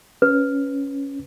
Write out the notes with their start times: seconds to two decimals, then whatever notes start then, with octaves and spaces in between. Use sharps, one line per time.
0.22 C#4 B4